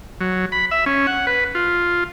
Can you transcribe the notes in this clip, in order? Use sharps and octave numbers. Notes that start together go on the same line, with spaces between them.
F#3
B5
E5
C#4
F#5
B4
F4